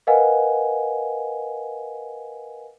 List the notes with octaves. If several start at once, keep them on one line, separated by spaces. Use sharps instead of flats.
A#4 B4 D#5 F5 F#5 G#5